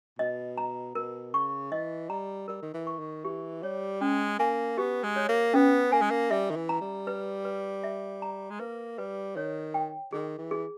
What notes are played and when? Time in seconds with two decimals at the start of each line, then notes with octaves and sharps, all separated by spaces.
0.19 B2 D#5
0.58 A#5
0.95 B2 A#4
1.34 C#3 C#6
1.72 E3 D#5
2.09 G3 A#5
2.48 G3 A#4
2.62 D#3
2.74 E3
2.87 C#6
2.99 D#3
3.25 E3 G4
3.62 G3 C#5
4.01 G#3 C#4
4.39 A#3 G#5
4.78 B3 G4
5.03 G#3
5.16 C#5
5.29 A#3
5.54 B3 C#4
5.92 A#3 G#5
6.02 G#3
6.11 A#3
6.31 G3 E5
6.50 D#3
6.56 E3
6.69 A#5
6.81 G3
7.07 B4
7.45 B4
7.83 E5
8.22 A#5
8.50 G#3
8.60 A#3 B4
8.98 G3 B4
9.36 D#3 C#5
9.74 G5
10.13 D#3 G#4
10.38 E3
10.51 G#4